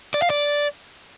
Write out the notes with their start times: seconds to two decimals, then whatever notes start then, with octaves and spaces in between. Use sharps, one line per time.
0.14 D5
0.22 F5
0.30 D5